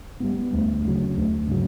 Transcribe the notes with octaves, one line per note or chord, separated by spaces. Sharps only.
G3 B3
D2
C#3 F#3
D2
C#3 F#3